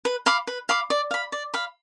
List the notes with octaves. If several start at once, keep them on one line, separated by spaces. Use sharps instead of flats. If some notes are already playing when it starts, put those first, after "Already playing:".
B4
F5 B5 D6
B4
F5 B5 D6
D5
F5 B5
D5
F5 B5